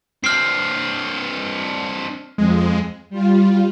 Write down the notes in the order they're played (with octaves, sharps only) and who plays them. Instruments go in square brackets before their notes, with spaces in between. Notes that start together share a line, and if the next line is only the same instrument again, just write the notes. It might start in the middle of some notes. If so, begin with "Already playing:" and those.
[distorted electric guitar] C4 D4 [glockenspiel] F6 C7
[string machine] F2 [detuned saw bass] G#3
[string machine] G3 F4